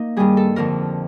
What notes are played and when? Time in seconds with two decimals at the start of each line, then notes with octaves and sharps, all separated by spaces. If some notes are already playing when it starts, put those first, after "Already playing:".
Already playing: A#3 D#4
0.16 G2 D#3 G3 G#4
0.37 A4
0.56 F2 D3 F3 A#4